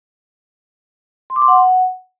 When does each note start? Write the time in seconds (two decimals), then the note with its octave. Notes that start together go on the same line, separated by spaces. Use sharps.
1.30 C6
1.36 D6
1.42 C6
1.48 F#5